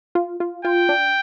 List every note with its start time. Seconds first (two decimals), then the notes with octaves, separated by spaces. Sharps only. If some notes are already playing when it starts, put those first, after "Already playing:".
0.15 F4
0.40 F4
0.65 F4 G5
0.89 D4